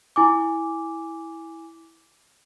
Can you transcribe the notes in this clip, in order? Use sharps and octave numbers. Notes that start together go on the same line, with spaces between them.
E4 G#5 D6